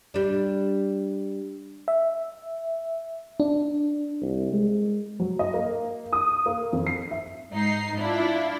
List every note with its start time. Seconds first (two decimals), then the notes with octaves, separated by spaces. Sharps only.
0.14 G3 D4
1.88 E5
3.40 D4
4.22 C2
4.53 G#3
5.20 F#3
5.39 D#5
5.54 A#3
6.13 D#6
6.46 A#3
6.73 F2
6.87 C7
7.11 E5
7.52 G#2 D#4 C7
7.97 D4 E4 F4